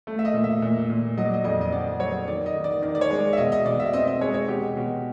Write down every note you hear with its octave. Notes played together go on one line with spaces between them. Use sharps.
A3
E5
D#5
A#2
E5
A#2
A#2
F#3 D#5
D5
D#5
F2 D#5
D#5
D3 D5
F#3 C#5
D#3 D5
D#5
D#3
D5
D#3 D5
D5
C#5
G#3
D5
E5
B2 D#5
D#5
B2 D5
E5
C4 D#5
D#5
G#3 C#5
C#5
B2 G4
B2